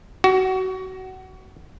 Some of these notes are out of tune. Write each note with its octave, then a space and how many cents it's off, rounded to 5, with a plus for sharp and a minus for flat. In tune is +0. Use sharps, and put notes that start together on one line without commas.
F#4 +25